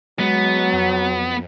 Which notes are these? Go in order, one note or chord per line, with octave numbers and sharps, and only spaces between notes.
F#3 G#3 B3
F2